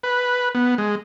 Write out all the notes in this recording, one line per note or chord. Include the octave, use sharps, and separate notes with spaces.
B4
B3
G#3